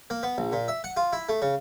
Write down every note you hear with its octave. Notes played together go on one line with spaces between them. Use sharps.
A#3
B3
A#1
A#2
E5
F#5
F4
E4
A3
C#3